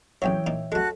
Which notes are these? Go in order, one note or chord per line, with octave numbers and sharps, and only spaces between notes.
A1 E2 E3 F#3 C#5 E5 G5
A#2 D#4
G#3 A3 F#4 A4 A5 F#6